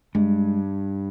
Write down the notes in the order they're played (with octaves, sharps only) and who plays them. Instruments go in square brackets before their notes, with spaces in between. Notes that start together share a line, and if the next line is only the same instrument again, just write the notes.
[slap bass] G2 [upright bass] G#3